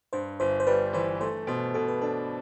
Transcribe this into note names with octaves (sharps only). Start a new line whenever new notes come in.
G2 C5
G1 C5
C5
G3 B4
E3 C5
A3 C5
B2 C5
B2 A4
B4
D4 A4